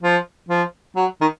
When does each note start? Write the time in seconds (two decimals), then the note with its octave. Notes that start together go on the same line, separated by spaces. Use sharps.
0.03 F3
0.48 F3
0.96 F#3
1.21 D#3